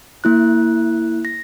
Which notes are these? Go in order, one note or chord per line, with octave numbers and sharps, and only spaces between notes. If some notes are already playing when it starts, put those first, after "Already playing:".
A#3 E4 F#6
A#6